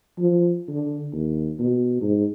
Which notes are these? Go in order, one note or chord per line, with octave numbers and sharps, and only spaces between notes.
F3
D3
D#2
B2
G#2